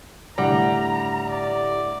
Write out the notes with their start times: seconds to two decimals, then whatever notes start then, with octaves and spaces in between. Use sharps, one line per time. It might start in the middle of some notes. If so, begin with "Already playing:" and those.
0.38 A2 D3 G3 F#5 A#5 A#6
1.29 D5